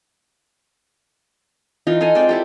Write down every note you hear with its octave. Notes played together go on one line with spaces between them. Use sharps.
E3 D#4 F4 A#4
A4 D#5 F5 G#5
G#3 C4 D5 G5
E4 G4 A4